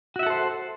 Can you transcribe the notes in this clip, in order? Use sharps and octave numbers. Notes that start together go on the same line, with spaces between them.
F#4 A4 C5 E5 F#5